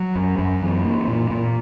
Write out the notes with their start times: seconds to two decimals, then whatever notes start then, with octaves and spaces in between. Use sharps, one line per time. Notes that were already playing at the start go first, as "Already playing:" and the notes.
Already playing: F#3
0.15 F#2
0.39 F#2
0.62 E3
0.85 A#3
1.08 A#2
1.30 A#2